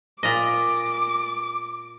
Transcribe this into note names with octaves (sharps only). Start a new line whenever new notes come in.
A#2 D#5 D6